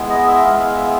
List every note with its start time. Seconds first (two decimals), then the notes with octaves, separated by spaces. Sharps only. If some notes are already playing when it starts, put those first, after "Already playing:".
Already playing: G#3 B3 E4
0.10 D#5
0.27 E5
0.43 G#3 B3 E4 F5
0.59 F5
0.76 E5